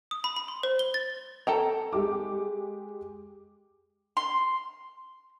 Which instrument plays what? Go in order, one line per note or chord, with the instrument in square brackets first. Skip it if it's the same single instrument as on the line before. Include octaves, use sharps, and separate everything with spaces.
[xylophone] D#6
B5
B5
C6
C5
G7
A6
[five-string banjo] A4 G5 A#5
[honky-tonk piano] G#3 G4 D6
[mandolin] C6